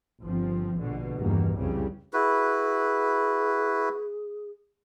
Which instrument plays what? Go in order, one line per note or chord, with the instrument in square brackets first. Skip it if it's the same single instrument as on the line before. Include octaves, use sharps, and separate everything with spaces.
[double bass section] G1 F3 C4
A#1 B2 D3
E2 G2 B2 D#3 A#3
C2 F2 C#3 E3 G3
[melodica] E4 F#4 B4 [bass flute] G#4